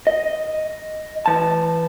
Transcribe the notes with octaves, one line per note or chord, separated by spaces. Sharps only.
D#5
E3 A5